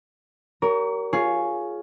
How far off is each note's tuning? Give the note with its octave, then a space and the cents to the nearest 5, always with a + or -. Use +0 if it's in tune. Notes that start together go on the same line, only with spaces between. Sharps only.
G4 -40 A#4 +0 C#5 +35
F4 +0 G#4 +10 C#5 +0